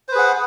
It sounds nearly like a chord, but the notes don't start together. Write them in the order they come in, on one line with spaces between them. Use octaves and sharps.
C5 B4 G#4 F#5